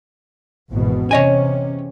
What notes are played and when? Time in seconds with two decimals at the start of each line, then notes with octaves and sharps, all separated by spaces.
0.70 G#1 E2 B2
1.11 E2 C3 C#4 C#5 D#5 G#5